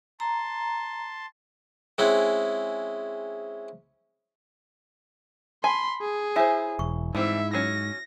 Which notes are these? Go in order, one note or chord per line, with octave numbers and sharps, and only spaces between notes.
A5 A#5 C6
G#3 C4 C#4 E4 F#5
G#5 A5 B5 C6
G#4
E4 C5 C#5 E5 G#5
E1 C#6
G#2 E3 G3 C4 E4 E5
F#3 C#4 A#6